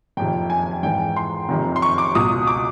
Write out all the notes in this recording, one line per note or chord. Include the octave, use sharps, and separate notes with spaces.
F#1 F2 C3 D#3 G5
G#5
G#5
G#1 G#2 E3 G5
C6
F#1 F2 C3 D#3
C6
C#6
D6
C#2 B2 D#6
D6